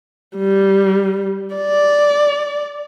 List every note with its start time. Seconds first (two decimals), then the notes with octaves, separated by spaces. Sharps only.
0.37 G3
1.55 D5